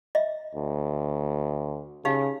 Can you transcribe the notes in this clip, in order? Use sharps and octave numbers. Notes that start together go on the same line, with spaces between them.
D#5 E5
D2
C#3 D#4 G4 F5